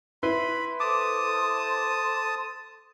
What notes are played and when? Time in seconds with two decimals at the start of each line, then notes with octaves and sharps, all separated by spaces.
0.23 E4 B4 B5 C6
0.80 A4 C5 A5 C6 D6 D#6